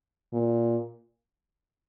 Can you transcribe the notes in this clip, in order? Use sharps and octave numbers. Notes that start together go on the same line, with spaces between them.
A#2